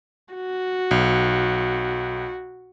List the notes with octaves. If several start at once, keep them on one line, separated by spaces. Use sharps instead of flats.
F#4
B1